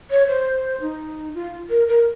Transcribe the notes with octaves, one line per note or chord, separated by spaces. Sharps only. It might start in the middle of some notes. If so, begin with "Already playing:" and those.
C#5
C5
D#4
F4
A#4
A#4